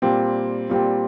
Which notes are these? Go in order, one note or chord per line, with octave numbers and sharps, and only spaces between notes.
A#2 G3 C4
A#2 G3 C4